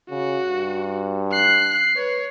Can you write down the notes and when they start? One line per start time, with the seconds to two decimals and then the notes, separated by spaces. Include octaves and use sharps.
0.10 C#3 F#4
0.46 G2
1.32 F#6 C7
1.96 B4 C#5